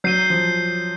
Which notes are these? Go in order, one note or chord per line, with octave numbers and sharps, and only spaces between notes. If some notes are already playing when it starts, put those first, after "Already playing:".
F#3 G6 C7 D#7 G7
F3